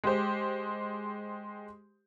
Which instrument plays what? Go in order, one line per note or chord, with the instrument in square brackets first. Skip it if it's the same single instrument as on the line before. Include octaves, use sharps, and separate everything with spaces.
[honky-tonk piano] G#3 G4 C5